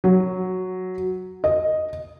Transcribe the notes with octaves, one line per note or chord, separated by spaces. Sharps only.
F#3
D#5